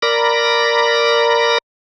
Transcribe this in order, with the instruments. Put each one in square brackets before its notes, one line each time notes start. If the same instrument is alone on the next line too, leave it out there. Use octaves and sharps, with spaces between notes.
[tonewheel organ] A#4 D5 B5 A#6